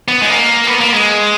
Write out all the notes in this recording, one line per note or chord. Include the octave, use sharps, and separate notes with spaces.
B3
G#3
A#3
B3
A#3
G#3